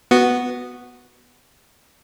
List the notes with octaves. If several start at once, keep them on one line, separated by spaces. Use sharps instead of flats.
B3 F#4